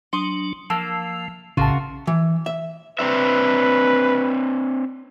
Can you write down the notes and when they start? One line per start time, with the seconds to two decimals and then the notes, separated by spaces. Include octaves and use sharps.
0.13 F#3 D4 C6 D#6
0.70 F3 A#3 A5 E6
1.57 A#1 A2 C#3 F4 F#4 A#4 A5
2.07 E3
2.46 E5
2.99 C4 D4 B4 E5